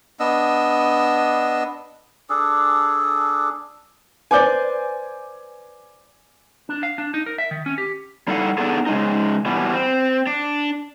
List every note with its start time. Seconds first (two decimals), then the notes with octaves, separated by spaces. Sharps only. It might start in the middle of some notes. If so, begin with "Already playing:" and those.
0.20 B3 D4 D#5 E6
2.30 D4 G#4 A4
4.31 B4 C5 D5 G#5 D6 G6
6.69 D4
6.83 F5
6.98 D4
7.14 D#4
7.26 A#4
7.38 E5
7.51 D#3
7.66 C#4
7.78 G4
8.28 G3 D#4 E4 A4 F5 F#5
8.58 B3 D4 D#4 G#4 A4
8.87 C#3 G#3 D#4
9.45 B2 E3 G3
9.74 C4
10.27 D4